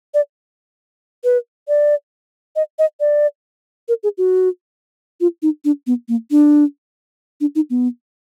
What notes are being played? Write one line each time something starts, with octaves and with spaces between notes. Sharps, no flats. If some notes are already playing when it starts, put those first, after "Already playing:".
D5
B4
D5
D#5
D#5
D5
A#4
G#4
F#4
F4
D#4
D4
B3
A#3
D4
D4
D#4
B3